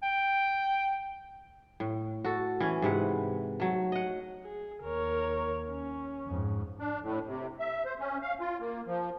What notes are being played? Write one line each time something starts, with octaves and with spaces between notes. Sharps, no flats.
G5
A2
F#4 A4
E3 C#4
G#2 C3 B4 F#5
F#3 A3
D#5 F#5
G#4
D#2 A#4 C#5
C#4
F2 G#2
D4
A2
C3
E5
C5
C#4
F5
F4
A#3
F3